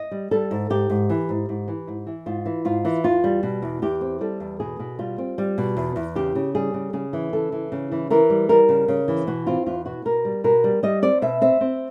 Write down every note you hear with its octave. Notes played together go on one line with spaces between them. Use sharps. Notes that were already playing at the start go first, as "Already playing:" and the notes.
Already playing: D#5
G3
G3 A4
G#2
G#2 G4
G#2
E3
G#2
G#2
E3
G#2
E3
G#2 F4
E3
G#2 F4
E3
E2 F4
G3
B2
E2
E2 G4
C4
G3 A4
E2
B2 G#4
B2
G3 F4
C4
G3
B2
E2
E2
C#3 G4
C#3
G3 G#4
C#3
C#3 G#4
E3
C#3 A4
E3
C#3
E3
E3 A#4
G3
G3 A#4
C#3
C#3
E3
B2 F#4
C4 F4
E2 F4
B2 F#4
B2 A#4
G3
B2 A#4
G3
G3 D#5
C4 D5
B2 E5
C4 E5
C4